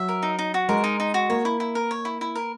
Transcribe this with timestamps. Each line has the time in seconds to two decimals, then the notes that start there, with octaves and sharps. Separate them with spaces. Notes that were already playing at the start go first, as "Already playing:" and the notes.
Already playing: F#3 E5
0.09 A#4
0.23 D#4
0.39 D#4
0.54 F#4
0.69 G#3 A#4
0.84 D#4
1.00 D#4
1.14 F#4
1.29 A#3 C#5
1.45 E4
1.60 E4
1.75 A#4
1.91 C#5
2.05 E4
2.21 E4
2.35 A#4